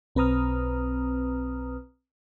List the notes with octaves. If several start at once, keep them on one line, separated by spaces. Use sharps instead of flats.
B1 C4 B4 A#5 D#6 F6